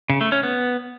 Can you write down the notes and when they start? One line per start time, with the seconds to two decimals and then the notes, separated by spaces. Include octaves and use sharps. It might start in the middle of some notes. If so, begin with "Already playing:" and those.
0.10 C#3
0.21 A3
0.32 C#4
0.43 B3